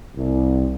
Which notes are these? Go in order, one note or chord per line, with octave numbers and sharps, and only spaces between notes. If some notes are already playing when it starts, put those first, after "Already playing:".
C2